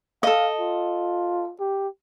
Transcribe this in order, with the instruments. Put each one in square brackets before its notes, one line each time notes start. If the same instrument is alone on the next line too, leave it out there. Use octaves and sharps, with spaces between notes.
[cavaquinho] A4 D#5 [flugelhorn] F5
[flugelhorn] F4
G4